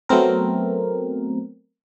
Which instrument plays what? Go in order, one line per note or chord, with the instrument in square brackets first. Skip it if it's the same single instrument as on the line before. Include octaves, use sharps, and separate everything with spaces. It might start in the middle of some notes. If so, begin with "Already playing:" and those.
[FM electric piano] F#3 A3 B3 C4 A#4